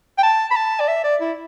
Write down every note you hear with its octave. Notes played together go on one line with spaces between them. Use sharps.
G5
A5
B5
A5
D5
E5
D5
E4